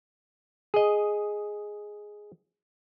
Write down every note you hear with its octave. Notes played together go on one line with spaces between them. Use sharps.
G#4 D#5